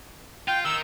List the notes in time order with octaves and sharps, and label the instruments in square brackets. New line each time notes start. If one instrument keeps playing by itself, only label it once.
[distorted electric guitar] F4 [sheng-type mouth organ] G5
[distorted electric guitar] D#3 [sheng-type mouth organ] E6